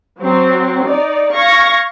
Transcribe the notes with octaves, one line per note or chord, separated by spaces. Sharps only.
F#3 C4
D#4 D5
F5 C#6 G#6 A#6